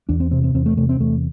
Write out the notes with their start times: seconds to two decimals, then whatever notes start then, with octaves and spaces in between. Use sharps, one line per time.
0.09 E2 D4
0.20 C4
0.31 C3 C4
0.44 C4
0.54 E2 C4
0.66 A3
0.77 C3 A3
0.89 C4
1.00 E2 A3